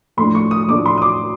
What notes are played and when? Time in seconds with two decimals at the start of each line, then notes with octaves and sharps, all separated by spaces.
0.17 A2 F3 A3 D4 C6
0.35 C#6
0.51 D#6
0.68 A2 F3 A3 D4 D6
0.86 C6
0.98 D#6
1.02 D6